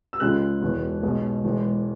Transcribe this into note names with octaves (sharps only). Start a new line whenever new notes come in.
E6
C#2 C#3 G#3 F#6
E1 E2 B2
B1 B2 G#3
E1 E2 E3 G#3